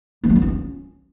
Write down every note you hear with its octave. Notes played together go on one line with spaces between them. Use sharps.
A#3
F#3
B3
F4
C#4